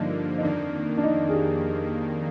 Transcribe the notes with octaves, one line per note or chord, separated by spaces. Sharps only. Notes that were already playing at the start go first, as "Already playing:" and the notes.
Already playing: G2 D3 F3 A#3 D4 D#4
D#4
F2 D#3 A#3 D4
D4
D#4
G#4
G4